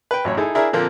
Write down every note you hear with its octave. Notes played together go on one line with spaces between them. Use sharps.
B4 G5
A1 F#2 C#5
D#4 E4 G#4 A4
D4 E4 G#4 A#4 E5 A#5
A#2 D3 F3 A#3 C4